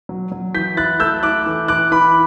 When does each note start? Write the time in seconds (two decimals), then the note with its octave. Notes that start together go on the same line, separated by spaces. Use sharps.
0.09 F#3
0.32 F#3
0.54 E3 G6 B6
0.77 E4 F#6 A6
1.00 A3 E6 G6
1.23 E4 D6 F#6
1.46 E3
1.68 E3 D6 F#6
1.91 E3 B5 D6